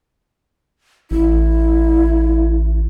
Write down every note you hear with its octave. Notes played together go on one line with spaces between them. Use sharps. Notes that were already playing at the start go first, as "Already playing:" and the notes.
A1 E4